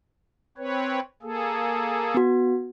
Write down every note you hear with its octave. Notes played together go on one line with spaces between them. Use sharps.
C4 B4 C#5
A#3 G#4 A4
B3 F#4